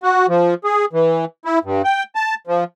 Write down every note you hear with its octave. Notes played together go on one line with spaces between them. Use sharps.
F#4
F3
G#4
E3
E4
G2
G5
A5
F3